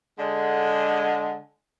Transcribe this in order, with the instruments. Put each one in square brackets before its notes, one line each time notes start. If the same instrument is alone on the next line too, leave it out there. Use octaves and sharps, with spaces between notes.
[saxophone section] D3 G#3